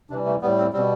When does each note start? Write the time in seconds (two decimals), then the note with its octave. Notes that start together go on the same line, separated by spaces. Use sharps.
0.10 C3 E3 G3 D4
0.26 A3
0.41 A2 G3 B3
0.58 C4
0.73 B2 G3 C4